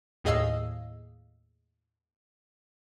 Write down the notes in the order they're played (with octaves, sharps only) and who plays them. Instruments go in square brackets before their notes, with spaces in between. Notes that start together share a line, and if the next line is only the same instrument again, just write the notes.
[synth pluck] D#2 A2 G#4 D#5 F5 E6